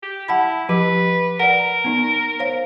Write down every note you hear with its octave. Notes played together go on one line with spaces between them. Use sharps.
G4
E4 F#5 A5 B5
F3 G4 B4 D6
A#4 D5 F#5
B3 D#4
C5 C#5 F5